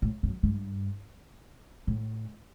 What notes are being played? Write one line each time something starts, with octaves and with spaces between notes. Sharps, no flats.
A2
F#2
G2
A2